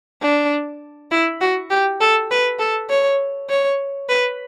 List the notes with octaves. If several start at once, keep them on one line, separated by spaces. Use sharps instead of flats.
D4
E4
F#4
G4
A4
B4
A4
C#5
C#5
B4